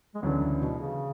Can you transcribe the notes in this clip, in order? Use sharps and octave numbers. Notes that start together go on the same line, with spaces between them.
G#3
D2 C#3 E3 F#3 B3 D4
B2
C#3